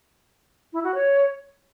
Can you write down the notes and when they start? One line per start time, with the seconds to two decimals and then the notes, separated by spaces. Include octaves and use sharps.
0.73 E4
0.84 F#4
0.95 C#5